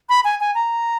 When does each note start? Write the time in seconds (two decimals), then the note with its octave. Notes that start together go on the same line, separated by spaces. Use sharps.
0.09 B5
0.25 G#5
0.40 G#5
0.55 A#5